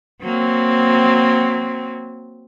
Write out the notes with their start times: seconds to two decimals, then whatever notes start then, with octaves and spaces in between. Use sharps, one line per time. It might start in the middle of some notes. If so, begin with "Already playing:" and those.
0.23 F#3 A#3 C4